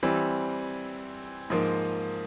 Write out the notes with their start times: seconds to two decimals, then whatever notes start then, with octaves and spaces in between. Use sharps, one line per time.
0.03 E3 G3 C4
1.50 G#2 F3 A#3